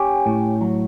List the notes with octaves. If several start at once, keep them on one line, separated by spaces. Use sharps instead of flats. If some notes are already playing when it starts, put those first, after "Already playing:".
Already playing: C#4 G4
A2
F#3